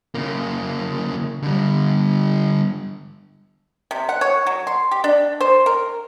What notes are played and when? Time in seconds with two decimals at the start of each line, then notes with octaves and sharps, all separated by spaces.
0.15 C#3 A#3
1.43 D3 G3
3.91 C3
4.09 F#5
4.21 C#5
4.47 F#3
4.67 C6
4.91 G4
5.04 D4
5.41 C5
5.66 A#4